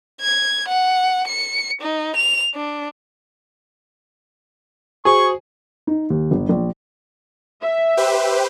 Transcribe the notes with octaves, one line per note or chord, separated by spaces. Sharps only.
G#6
F#5
C#7
D#4
F7
D4
F#4 G#4 C5 C#6
D#4
D#2
G1
A#1
E5
G4 B4 C5